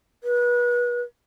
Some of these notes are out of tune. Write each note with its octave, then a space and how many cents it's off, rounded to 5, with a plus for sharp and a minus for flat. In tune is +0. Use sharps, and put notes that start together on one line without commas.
B4 -30